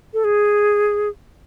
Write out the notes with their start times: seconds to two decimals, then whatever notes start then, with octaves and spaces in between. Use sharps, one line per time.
0.14 A4
0.24 G#4